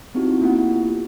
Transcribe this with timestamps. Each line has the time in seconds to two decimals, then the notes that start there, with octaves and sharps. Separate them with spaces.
0.14 B3 C4 D#4 E4 F#4 G4
0.41 A#3 E4 F4 G4 F#5